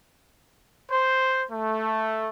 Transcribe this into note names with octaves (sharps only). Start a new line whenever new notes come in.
C5
A3